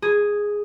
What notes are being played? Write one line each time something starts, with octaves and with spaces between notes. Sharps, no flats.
G#4